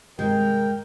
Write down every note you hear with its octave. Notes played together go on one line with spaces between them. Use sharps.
G2 C3 D#3 G#3 A#4 G5